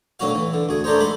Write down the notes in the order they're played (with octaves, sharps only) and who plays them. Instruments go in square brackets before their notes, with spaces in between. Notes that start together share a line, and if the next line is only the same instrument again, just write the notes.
[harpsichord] A2 D3 F#3 F#4 F5
E3
D3
D2 G#4
A3 D4 A#4 C5 C#5
G#2 A4 B5 C6